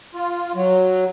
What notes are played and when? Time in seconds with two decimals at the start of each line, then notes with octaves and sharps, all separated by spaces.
0.15 F4
0.55 F#3